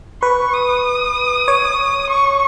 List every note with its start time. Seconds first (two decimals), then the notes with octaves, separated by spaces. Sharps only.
0.23 B4 C#6
0.54 D#6
1.48 C#5
2.10 C#6